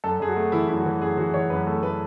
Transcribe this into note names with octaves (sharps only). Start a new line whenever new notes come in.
F#2 A4
F#2 G#4
F#4
A3
E3 E4
F#2 E4
F#4
E3
F#2 G#4
E3 F#4
E3 C#5
F#2 B4
A3 A4
A3 B4